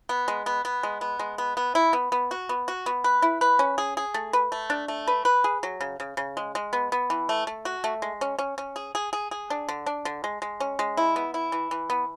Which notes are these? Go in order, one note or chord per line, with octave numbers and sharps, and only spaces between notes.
B3
G#3
B3
B3
G#3
B3
G#3
B3
B3
E4
B3
B3
F#4
B3
F#4
B3
B4
E4
B4
C#4
G#4
G#4
A3
B4
A3
D4
A3
B4
B4
G#4
F#3
C#3
C#3
C#3
G#3
G#3
B3
B3
E3
A3
A3
F#4
A3
G#3
C#4
C#4
C#4
G#4
G#4
G#4
G#4
D4
D3
D4
D3
G#3
G#3
C#4
G#3
E4
B3
E4
E3
E3
B3